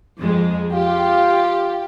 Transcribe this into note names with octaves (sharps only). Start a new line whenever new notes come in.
F2 G#3
F4 G4